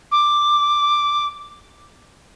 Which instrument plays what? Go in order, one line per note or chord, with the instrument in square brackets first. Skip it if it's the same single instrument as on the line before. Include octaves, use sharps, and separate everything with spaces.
[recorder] D6